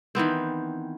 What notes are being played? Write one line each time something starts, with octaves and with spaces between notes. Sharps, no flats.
D#3 E3 B3 C4